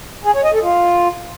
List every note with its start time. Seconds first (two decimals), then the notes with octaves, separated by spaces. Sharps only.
0.24 G#4
0.34 C#5
0.44 D#5
0.53 A4
0.63 F4